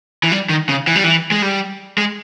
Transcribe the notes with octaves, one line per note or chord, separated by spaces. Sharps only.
E3
G3
D#3
C#3
E3
G3
E3
G#3
G3
G#3